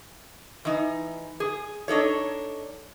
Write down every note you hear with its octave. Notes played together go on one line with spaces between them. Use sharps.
E3 D#4
G#4
D4 D#4 A4 C#5